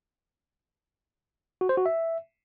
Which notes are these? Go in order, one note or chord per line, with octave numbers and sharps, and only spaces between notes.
F#4
C5
F#4
E5